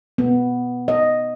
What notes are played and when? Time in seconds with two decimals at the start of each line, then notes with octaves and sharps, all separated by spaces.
0.18 B3
0.88 D#5